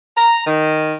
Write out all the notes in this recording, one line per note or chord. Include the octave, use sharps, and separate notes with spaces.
A#5
D#3